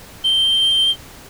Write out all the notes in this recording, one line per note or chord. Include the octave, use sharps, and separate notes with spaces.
G7